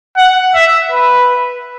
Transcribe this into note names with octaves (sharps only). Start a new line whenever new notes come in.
F#5
E5
B4